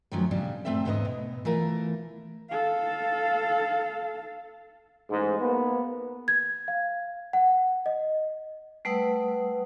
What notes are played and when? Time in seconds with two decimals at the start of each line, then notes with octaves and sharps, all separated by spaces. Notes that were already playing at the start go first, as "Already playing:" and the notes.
0.12 F#2 D#3 F3 F#3 A3 C#4
0.31 A#2 C#3 G3 D4
0.65 G2 A#2 A3 C4 A4 E5
0.85 E2 G#2 D3 B3 D4 D#5
1.05 B2
1.45 E3 A3 F4 A#4
2.50 A4 F5
5.10 A1 G#2
5.40 A#3 B3
6.28 G#6
6.68 F5
7.33 F#5
7.86 D#5
8.85 G3 A3 B4 F#5 D#6 E6